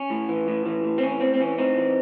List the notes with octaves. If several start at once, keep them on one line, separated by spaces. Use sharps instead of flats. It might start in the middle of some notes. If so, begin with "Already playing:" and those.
Already playing: C#4
A2
E3
A2
E3
A2
C4
E3 C#4
A2 C4
C4
E3 C#4
A2 C4 D#4
E3